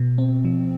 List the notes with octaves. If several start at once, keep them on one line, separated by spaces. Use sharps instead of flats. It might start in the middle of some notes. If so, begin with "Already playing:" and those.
Already playing: B2
C4
F3